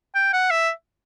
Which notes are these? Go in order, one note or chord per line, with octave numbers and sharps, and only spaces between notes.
G5
F#5
E5